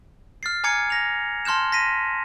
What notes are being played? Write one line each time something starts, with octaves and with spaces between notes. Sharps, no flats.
F6 A6 C7
G#5 A#5 D6 F6 G#6 C#7
A#6 F7
A5 C6 F6 G6 E7
A#6 B6 D#7